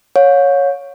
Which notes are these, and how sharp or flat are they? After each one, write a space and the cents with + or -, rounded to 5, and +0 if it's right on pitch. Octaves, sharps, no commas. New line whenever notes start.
C#5 +0 F5 +40